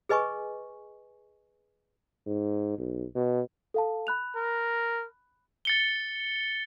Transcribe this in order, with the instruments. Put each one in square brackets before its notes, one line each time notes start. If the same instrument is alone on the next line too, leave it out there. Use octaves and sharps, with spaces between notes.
[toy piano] G#4 B4 D#5 G#5 C#6
[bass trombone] G#2
B1
B2
[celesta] A4 F5 A5
B5 F#6 F7
[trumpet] A#4
[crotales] A6 C#7 G7